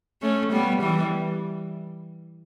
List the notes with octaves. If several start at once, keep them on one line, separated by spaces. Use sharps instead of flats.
A3 C#4
G3 B3
E3 G3